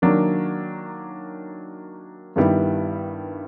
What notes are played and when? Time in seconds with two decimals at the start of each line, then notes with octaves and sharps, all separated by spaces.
0.02 D#3 F#3 A#3 D4
2.36 G2 D#3 G3 B3 E4